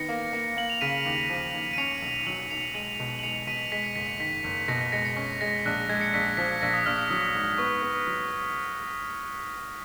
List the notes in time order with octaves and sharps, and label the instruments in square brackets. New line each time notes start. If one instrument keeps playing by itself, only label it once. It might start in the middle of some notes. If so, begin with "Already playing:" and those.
Already playing: [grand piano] D#3 B3 [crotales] A#6 C#7
[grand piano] A#3
A#3
[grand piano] A#3 [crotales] F#7
[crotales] F7
[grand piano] C#3 [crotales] B6 D#7
[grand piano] D#2
F3
D#2
[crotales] D#7
[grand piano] C#4 [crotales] C#7 F7
[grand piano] B1
[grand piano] F#3 [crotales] D#7 F#7
[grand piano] B1 [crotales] C#7 F7
[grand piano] G#3 [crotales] D#7 F#7
[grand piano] B2
[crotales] F#7
[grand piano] G#3 [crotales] C#7 F7
[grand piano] B2 [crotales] B6 D#7
[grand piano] G#3 [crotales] B6
[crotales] C#7
[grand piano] F#1 [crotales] B6
[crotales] C#7
[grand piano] D#3 [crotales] B6
[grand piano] F#1
[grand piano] B2 [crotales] A#6 C#7
[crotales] B6
[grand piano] G#3 [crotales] A#6 C#7
[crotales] C#7
[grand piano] C#4 [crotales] B6
[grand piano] G#3 [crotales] A#6
[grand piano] A#1 [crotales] F#6
[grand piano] G#3 [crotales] G#6
[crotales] C#7
[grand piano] A#1 [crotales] B6
[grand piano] F3 [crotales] B6
[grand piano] A#1 [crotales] A#6
[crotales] D#6
[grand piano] A#1 [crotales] F6
[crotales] D#6
F6
[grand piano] F#3 [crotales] D#6
[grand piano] G#2
[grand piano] B3 [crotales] C#6
[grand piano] B3
F#3